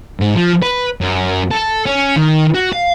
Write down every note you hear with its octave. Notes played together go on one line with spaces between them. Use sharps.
G#2
F3
B4
F#2
A4
C#4
D#3
F#4
F5